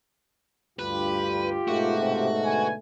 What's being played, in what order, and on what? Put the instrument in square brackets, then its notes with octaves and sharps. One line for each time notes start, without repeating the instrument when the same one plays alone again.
[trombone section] D2 G2 [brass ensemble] F4 G4 [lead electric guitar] B4
[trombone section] G#2 B2 A3 [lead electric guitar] F#4
[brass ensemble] C3 F4 G4
D3 B4 G#5